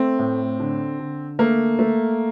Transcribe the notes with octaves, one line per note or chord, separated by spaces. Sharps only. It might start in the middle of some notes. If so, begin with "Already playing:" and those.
Already playing: A3 C4
A2
D3
D3
A3 A#3
A3